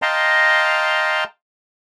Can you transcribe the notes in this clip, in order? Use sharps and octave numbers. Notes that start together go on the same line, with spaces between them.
D#5 F5 G5 A5 A#5 C6